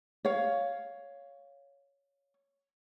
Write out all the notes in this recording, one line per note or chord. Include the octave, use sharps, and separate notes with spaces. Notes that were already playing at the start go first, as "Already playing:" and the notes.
C#5 F5